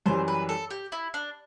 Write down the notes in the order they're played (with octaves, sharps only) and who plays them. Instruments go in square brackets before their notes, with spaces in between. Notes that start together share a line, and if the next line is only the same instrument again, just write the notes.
[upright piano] F#2 E3 G3 [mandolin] C5
[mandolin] B4
A4
G4
E4
D4